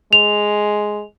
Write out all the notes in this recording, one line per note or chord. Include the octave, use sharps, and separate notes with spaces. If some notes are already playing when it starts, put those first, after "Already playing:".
G#3 F7